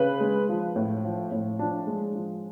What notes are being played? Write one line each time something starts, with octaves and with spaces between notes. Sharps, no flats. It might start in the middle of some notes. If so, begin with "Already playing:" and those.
Already playing: C#3 B4
G#3
F3
A2
F3
A2
F3 D4
G#3
F3